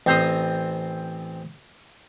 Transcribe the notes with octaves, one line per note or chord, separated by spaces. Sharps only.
A1 C4 C5 A#5 C6 D#6